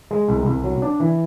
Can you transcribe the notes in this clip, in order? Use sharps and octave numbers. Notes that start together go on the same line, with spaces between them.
G#3
C2
C2
F#3
D4
E3